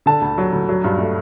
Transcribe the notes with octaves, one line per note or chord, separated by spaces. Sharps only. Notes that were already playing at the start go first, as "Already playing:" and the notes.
D3 A5
D2
F#3
D2
F#3
G2
A3